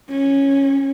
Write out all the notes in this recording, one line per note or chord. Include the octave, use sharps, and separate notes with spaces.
C#4